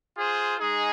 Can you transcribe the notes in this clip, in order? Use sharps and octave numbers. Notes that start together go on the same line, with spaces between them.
F4 G#4 C5
G#3 D#4 G#4